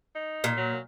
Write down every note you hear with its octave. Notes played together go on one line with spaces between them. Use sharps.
D#4
A#2
F#3